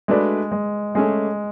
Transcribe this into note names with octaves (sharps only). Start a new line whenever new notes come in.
G#3 A3 D4 F#4 B4 D5
G#3
G#3 A3 C#4 G#4